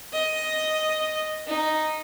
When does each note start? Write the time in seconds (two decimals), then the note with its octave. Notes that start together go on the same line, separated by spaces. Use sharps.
0.13 D#5
1.47 D#4